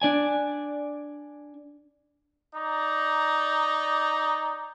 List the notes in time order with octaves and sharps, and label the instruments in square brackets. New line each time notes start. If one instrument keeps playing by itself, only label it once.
[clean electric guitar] D4 D5 G#5
[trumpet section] D#4 D5 A#5